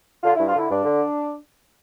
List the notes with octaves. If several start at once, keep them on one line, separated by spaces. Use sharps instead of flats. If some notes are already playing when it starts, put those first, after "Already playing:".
D3 F4
E4
G2
F4
D3 E4
G2 D4
D3